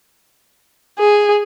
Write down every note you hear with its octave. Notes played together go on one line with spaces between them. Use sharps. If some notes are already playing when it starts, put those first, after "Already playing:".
G#4